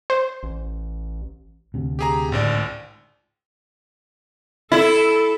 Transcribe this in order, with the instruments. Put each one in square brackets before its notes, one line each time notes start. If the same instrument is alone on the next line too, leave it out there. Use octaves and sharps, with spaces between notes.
[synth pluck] C5
[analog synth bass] A1
[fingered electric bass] D2 C3
[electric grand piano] G4 G#4 A#5
[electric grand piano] G#1 C#2 D5 [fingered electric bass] A2 D3
[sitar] E4 [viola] A4